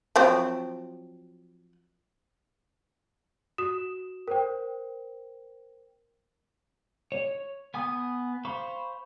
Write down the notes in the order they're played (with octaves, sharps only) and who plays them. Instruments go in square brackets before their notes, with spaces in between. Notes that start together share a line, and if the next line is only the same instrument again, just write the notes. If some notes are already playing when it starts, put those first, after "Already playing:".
[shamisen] F3 F#3 C4
[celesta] F#4 D#6 E7
A#4 C5 G5
[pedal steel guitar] C#5
B3 G#5 D#6
C5 F5 B5 C#6